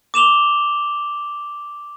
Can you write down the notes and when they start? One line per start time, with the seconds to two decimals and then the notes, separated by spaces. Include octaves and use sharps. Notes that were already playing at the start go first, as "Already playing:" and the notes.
0.14 D6 E7 F7 G7